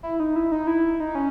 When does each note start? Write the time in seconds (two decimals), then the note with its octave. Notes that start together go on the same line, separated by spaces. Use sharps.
0.03 E4
0.20 D#4
0.36 E4
0.52 D#4
0.67 E4
1.00 D#4
1.15 C#4